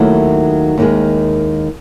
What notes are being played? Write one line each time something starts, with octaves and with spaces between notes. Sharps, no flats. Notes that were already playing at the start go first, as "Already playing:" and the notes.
Already playing: D#2 D#3 F#3 A3 E4
D#2 D#3 G#3